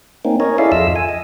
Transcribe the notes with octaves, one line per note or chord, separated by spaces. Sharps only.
A#3 C4 C#4 D#4
C#4 A#4 C#5 D#5
E4 G#4 A4 D5 E5 F5
F2 F4 D#5 E5 E6
G#5
D#5